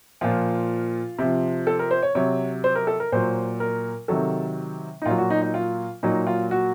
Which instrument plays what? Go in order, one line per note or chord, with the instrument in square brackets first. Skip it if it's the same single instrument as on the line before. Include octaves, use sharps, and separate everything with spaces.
[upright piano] A#2 F3 F4
C3 F3
A4
A#4
C5
C#5
C3 F#3 C#5
C5
A#4
A4
A#4
A#2 F#3 C5
A#4
C3 D#3 F#3 A4
D#4
A#2 F#3 F4
F#4
D#4
D#4
F4
A#2 F#3 D#4
F4
F#4